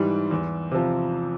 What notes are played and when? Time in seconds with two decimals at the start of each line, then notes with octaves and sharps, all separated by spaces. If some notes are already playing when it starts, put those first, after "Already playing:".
Already playing: G#2 E3 G3
0.31 E2
0.71 C3 F3